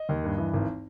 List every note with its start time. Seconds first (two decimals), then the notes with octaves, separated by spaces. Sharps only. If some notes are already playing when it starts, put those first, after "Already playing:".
Already playing: D#5
0.09 D#2
0.24 G2
0.38 E3
0.53 G#1